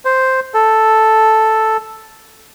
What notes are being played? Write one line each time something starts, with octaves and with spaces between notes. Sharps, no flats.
C5
A4